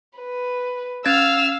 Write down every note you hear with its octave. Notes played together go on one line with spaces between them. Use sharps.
B4
C#4 F5 E6 F6 G#6 A6